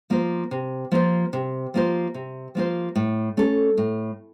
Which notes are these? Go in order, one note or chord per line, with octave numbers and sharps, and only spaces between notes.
F3 A#3 F4 C5
C3
F3 A#3 F4 C5
C3
F3 A#3 F4 C5
C3
F3 A#3 F4 C5
A2
A3 C#4 A4
A2